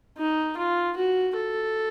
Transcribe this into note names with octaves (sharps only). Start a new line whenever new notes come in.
D#4
F4
F#4
A4